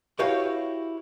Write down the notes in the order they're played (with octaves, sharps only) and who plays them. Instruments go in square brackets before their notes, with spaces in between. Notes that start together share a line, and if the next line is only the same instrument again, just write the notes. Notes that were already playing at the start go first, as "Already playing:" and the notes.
[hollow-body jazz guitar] E4 F#4 G4 B4 C#5 F5